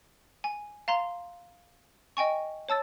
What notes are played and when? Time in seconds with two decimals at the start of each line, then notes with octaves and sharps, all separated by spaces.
0.44 G#5
0.88 F5 A#5 C6
2.17 D#5 G5 G#5 C#6
2.69 C#5 A5 E6 A6